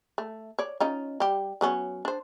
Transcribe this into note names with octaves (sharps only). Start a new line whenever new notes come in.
A3
C#5 D5
C#4 D#4 F4
G3 G4
F#3 B3 C#4
D4 C5